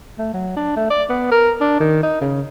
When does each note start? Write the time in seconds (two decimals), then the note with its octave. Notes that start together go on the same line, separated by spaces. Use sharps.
0.19 A3
0.34 F#3
0.57 D4
0.76 A3
0.90 D5
1.10 B3
1.32 A#4
1.61 D4
1.80 D#3
2.03 D#4
2.21 C#3